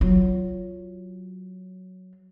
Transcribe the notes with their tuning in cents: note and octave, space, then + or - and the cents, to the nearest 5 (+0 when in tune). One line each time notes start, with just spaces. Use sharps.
F#3 +0 F4 +0